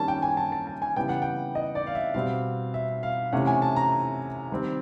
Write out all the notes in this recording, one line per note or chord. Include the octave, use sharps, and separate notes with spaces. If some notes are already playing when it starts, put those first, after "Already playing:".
Already playing: D#3 G3 A#3 C#4 A5
G5
G#5
A5
A5
A5
G#5
C#3 E3 G3 B3 G5
F#5
G5
D#5
D5
F5
E5
B2 G3 C4 F5
E5
F5
C3 E3 A3 C#4 F#5
G#5
A5
A#5
D#3 G3 C4